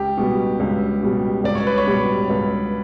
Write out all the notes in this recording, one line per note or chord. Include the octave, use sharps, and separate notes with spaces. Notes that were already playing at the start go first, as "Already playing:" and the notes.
Already playing: C#2 G4
B2 G3
C#2
B2 G3
C#2 D5
C#5
B4
C#5
B2 G3
C#2